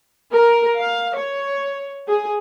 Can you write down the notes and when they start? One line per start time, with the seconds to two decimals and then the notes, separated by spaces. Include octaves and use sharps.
0.31 A#4
0.79 F5
1.15 C#5
2.08 G#4